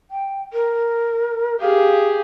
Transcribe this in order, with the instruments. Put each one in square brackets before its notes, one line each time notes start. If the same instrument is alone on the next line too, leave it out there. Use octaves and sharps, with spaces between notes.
[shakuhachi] G5
A#4
[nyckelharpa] G4 G#4 [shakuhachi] F5